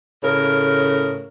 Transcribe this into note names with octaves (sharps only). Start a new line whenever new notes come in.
A2 C#3 A#4 C#5